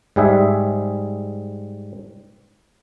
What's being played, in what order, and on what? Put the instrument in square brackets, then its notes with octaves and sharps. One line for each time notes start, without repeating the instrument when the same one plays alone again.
[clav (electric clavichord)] G#2 G3 G#4 E5